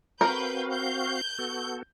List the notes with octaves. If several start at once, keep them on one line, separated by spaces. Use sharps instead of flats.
C4 F#4 A#4 B4 F5 G6
G6
B3 F#4 A4